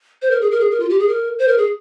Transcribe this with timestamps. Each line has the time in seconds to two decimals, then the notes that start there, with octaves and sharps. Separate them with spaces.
0.22 C5
0.31 A#4
0.41 G#4
0.51 A#4
0.61 G#4
0.71 A#4
0.80 F4
0.90 G4
0.99 G#4
1.09 A#4
1.39 C5
1.48 A#4
1.58 G#4